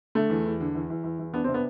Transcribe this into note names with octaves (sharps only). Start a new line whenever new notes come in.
D3 A3
E2
E2
D3
E2
E2
E2
E2
B3 D4
C4
C3
B3